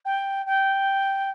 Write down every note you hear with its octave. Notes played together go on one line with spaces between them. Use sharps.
G5
G5